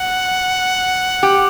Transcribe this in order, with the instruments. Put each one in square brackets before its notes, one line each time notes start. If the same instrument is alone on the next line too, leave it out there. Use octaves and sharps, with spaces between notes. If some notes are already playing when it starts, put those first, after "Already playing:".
Already playing: [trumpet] F#5
[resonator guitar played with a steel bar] G4